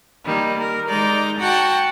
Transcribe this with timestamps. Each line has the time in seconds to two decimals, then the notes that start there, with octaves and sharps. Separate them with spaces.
0.24 D#3 G3 A#3
0.58 A#4
0.89 D#3 G#3 D#4 D5 A#5 G6
1.38 F#4 F#5 G5 A5